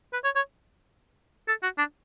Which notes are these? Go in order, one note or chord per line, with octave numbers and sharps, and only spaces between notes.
B4
C#5
C#5
A4
F#4
D4